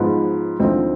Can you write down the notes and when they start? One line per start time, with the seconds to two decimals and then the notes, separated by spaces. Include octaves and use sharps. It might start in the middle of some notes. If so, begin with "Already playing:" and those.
Already playing: G#2 F3 B3 D#4
0.59 D2 D3 F3 C4 D#4